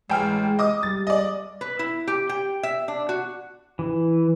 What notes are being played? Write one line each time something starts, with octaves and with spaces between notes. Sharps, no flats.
A1 G#3 G5 F6
D#5 D6 D#6
G3 A6
D5 D#5
B4
E4
G4
G5
E5
D4
F#4
E3